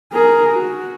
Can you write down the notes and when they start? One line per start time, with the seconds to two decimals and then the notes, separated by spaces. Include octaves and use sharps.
0.13 G#4 A#4
0.53 F#4